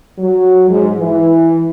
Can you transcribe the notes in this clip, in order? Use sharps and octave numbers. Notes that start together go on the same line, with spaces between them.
F#3
G#2
E3